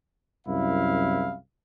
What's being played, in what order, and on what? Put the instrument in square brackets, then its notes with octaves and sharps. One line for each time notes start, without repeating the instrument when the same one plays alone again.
[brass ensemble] C2 F#2 E4 F5